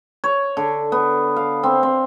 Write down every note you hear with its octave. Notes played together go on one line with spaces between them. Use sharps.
C#5
D3
B3
F5
C4
C4